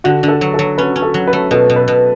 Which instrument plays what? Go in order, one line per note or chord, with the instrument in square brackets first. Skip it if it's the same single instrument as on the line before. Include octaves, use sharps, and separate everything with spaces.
[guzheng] D3 [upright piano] F#4
[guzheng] D3
[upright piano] A4
[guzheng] F#3
[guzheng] F#3 [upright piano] A4
[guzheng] C#4 [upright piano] B4
[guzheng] C#4
[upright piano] A4
[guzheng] F#3
[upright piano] B4
[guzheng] A3
[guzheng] B2 [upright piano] A4
[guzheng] B2
[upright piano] B4
[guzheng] B2